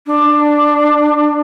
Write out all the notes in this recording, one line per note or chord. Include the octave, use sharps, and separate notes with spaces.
D4